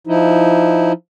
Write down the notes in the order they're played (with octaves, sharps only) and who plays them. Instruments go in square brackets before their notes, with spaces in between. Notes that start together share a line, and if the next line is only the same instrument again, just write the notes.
[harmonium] F3 D#4 E4